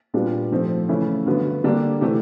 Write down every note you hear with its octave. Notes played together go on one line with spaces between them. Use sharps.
A#2 G3 B3 D4 F4
G#2 F3 A3 C4
C#3 E3 A3 C#4 E4
G2 D3 F#3 B3
D3 G3 A#3 D4
C3 E3 A3